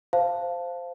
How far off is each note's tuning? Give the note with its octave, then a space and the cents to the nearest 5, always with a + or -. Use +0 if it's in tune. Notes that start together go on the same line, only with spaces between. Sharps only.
C5 -5 F5 -10 A5 +0